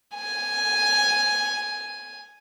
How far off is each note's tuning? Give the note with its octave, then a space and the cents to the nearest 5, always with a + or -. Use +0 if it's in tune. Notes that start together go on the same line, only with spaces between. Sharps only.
G#5 +0